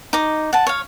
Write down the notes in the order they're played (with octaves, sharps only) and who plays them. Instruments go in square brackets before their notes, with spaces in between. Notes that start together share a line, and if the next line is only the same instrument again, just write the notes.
[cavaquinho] D#4 D6
F#5 A5
C#5 F5